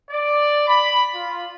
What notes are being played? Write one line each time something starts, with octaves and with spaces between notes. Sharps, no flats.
D5
B5
F4